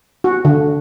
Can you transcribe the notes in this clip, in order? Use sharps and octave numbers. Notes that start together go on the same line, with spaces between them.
F#4
D3